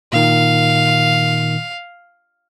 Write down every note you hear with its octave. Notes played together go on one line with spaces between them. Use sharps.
A#2 D#3 F5